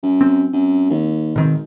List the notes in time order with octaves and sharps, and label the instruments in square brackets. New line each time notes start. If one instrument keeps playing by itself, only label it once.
[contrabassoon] F#2
[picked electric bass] C4
[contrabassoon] F#2
D#2
[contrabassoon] G#1 [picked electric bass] B2 D#3 C4